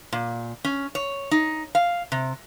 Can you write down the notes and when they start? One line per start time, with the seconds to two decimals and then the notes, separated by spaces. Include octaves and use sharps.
0.13 A#2
0.65 C#4
0.95 C#5
1.31 D#4
1.75 F5
2.12 C3